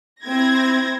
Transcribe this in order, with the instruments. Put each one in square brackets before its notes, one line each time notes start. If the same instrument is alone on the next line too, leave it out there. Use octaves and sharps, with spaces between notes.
[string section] C4 E4 G#6 A#6